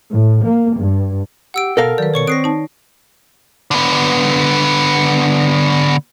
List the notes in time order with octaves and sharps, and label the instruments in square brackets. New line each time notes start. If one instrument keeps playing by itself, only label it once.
[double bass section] A2
A#3
G2
[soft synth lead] G4 [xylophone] F#5 E6 D7
[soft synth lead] B2 [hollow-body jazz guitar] A4 A#4 F5
[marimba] D#3 B4 [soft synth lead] F#3 [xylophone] D5
[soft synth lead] B2 [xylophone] C#5 C#6 C#7
[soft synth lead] C4 [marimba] C#6 D#6 F#6 [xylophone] A#6 C7 D7
[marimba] D#4 A5
[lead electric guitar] D3 B3